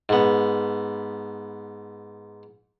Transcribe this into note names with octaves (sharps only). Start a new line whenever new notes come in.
G#2 B3